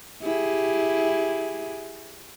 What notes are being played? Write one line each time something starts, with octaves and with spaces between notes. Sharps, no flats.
E4 G4 G#4